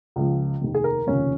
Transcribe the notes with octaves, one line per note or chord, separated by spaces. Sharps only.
C#2 C#3 F3
F1 D#2 D#3
G#4
A#4
F1 D#2 C#3 F3 C#4